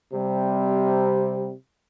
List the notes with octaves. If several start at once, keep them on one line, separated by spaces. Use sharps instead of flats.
C3 G3